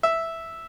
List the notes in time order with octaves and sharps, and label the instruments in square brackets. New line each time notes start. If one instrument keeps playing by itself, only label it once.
[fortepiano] E5